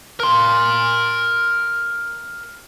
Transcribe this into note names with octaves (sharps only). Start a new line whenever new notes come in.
A#4 C6